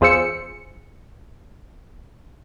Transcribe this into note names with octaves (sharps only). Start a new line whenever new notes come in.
E2 F4 G#4 C5 E6 C#7